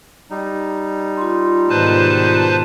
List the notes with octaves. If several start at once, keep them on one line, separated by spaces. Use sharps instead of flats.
G3 D#4
F4 C6
G#2 B2 D#3 B4 C5 A5